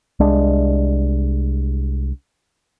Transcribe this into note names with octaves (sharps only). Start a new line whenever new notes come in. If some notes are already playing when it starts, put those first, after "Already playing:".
C2 G#3 D4